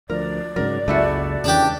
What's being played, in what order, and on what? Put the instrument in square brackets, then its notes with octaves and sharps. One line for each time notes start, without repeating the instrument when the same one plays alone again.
[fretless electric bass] D2 F3 [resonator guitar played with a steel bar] A#4 [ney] D5
[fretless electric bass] G#2 C#3 F#3 [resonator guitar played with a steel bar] A#4
[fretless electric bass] F#1 C#2 G#3 [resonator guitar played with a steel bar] A3 E4 F#4
[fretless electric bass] C#3 E3 [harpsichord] D4 G4